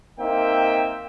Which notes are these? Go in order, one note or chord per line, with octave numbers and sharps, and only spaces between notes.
A#3 C4 D#4 E5 G5